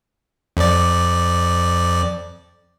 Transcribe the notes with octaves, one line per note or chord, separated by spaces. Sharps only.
F2 D5